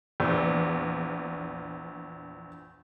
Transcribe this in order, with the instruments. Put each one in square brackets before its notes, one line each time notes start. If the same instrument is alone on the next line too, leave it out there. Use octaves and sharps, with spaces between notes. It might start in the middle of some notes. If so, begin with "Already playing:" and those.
[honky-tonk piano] A#1 E2